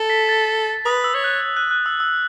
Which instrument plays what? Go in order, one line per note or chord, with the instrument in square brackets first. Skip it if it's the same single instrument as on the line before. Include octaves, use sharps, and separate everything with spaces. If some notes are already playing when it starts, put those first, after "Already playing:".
Already playing: [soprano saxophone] A4
[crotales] B6
A6
[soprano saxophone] B4 [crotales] D#6
[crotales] E6
[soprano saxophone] C#5
[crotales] F#6
F#6
F#6
E6
E6